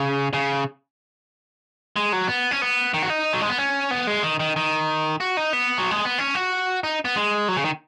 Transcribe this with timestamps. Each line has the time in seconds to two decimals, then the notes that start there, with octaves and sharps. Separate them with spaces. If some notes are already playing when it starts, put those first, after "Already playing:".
Already playing: C#3
0.34 C#3
1.96 G#3
2.12 F#3
2.28 B3
2.51 C#4
2.62 B3
2.94 D#3
3.02 F#4
3.10 D#4
3.33 F#3
3.41 G#3
3.49 B3
3.58 C#4
3.91 B3
4.07 G#3
4.23 D#3
4.40 D#3
4.56 D#3
5.20 F#4
5.37 D#4
5.53 B3
5.78 F#3
5.91 G#3
6.05 B3
6.18 C#4
6.35 F#4
6.84 D#4
7.05 B3
7.16 G#3
7.48 F#3
7.57 C#3
7.65 D#3